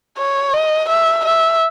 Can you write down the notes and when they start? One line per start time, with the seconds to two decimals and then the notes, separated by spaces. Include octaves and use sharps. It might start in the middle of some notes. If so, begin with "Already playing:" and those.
0.18 C#5
0.53 D#5
0.89 E5
1.25 E5